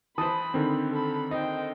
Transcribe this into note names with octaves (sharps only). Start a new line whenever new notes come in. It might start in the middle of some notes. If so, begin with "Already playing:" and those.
E3 B4 C5 A5 B5 D#6
D3 D#3 C4
A4 B5
D#4 C5 G5